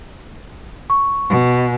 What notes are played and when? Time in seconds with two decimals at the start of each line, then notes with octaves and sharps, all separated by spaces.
0.90 C#6
1.30 B2